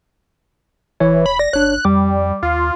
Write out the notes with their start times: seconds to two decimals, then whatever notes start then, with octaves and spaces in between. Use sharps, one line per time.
1.00 E1 E3 C#5
1.26 B5
1.39 D5 A#6
1.53 G1 D4 C#5 F#6
1.85 F2 G3 D6
2.43 D#2 F4